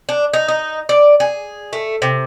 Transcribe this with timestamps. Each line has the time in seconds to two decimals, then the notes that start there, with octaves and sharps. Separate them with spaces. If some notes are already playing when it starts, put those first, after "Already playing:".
0.09 D4
0.33 D#4
0.48 D#4
0.89 D5
1.20 G#4
1.73 A3
2.02 C3